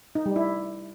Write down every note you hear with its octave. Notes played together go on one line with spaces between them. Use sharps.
D#4
G3
E4